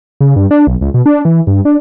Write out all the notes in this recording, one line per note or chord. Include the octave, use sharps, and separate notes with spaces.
C#3
G2
D4
B1
C#2
B2
D4
E3
G2
D4